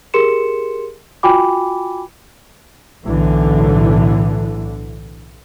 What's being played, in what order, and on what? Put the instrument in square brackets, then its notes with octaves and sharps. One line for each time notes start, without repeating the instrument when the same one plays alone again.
[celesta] G4 G#4 A#4 C6 C#7 E7
F4 F#4 G5 G#5 B5 D6
[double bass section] B1 A2 D3 E3